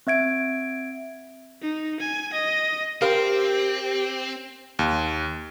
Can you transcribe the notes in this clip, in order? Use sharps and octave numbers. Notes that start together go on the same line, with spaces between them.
C4 E5 G#6 D7
D#4
G#5
D#5
C4 G4 A#4 C5 F5
D#2